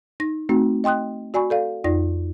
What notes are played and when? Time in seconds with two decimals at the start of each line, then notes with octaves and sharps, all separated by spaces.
0.20 D#4 A#6
0.49 A3 C4 D#4 F#4
0.84 D#5 G5 C6 D#6 F#6
1.34 F#4 D5 G#5 B5 C#6
1.50 A4 D5 F5
1.84 F2 D#4 F4 D5 A#6